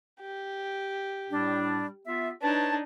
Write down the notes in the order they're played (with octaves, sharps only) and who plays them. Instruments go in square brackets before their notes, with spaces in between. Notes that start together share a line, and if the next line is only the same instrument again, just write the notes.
[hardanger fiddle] G4
[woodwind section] A2 G3 D4
B3 F4 E5
[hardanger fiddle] D4 D#4 [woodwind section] B4 C#5 A5